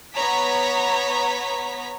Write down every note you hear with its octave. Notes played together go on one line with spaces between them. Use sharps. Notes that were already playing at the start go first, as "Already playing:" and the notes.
B3 C#5 A#5 B6